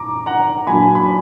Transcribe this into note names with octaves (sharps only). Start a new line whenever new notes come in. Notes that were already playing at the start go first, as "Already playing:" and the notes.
Already playing: A#5 D6
F#5 A#5
A#2 F#3 D4 G#5 B5
B5